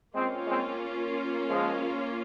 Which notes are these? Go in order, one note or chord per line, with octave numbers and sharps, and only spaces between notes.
G#3 A#3 C4 C#4 F4
G#3 C4
F3 G#3